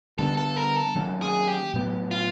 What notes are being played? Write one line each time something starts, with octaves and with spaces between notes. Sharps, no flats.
D3 G3 B3 D4 A4
A4
A#4
A4
D#3 F#3 A#3 C#4
G#4
G4
A2 F#3 B3
F4